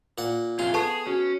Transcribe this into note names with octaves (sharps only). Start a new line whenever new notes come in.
A#2 F#5
F2 C3 F4 G#4
B3 G#4 A4 A5 C#6
C#4 F#4